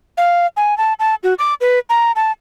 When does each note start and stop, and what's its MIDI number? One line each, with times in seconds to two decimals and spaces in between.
0.17 0.46 77
0.57 0.77 80
0.78 0.93 81
0.99 1.15 81
1.23 1.34 66
1.39 1.54 86
1.61 1.79 71
1.89 2.12 82
2.16 2.32 81